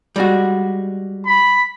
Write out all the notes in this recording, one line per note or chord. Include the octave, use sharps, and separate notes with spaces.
G3 G#3 F#4
B5